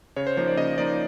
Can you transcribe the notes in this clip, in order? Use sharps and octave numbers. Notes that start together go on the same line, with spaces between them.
C#3 C#5
C5
F3 A#3 D#4 C5
D5
C#3 D#5
F3 A#3 D#4 D5